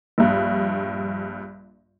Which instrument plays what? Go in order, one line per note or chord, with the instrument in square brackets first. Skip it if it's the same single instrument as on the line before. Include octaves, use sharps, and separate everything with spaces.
[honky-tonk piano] A#1 G2